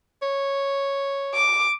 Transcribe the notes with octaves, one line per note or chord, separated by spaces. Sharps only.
C#5
D6